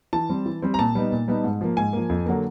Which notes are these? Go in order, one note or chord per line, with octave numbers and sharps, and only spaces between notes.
E3 A5
G3 C4
E3
G3 C4
A#5
A#2 A5
G3 B3 D#4
A#2
G3 B3 D#4
G#2
F3 A#3
G#2 G#5
F3 A#3
F2
D3 F#3 A#3